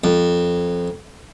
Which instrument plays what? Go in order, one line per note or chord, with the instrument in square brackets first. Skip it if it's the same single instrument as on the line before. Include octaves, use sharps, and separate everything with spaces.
[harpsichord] F2